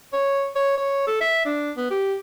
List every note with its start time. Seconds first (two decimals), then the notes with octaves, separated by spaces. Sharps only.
0.13 C#5
0.55 C#5
0.77 C#5
1.07 A4
1.21 E5
1.45 D4
1.77 B3
1.91 G4